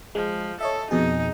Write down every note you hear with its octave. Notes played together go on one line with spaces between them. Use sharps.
F3 G#3
A4 C#5 D#5 E5
F2 B2 D#4 G#4